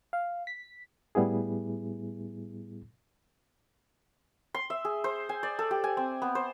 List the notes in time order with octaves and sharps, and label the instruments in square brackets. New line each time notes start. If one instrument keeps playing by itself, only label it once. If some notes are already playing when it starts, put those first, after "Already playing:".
[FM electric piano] F5
B6
[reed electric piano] A2 G3 B3 E4 G#4
[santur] C6
E5
G#4
C5
G#5
D5
A4
G4
G#5
C4
B3
C5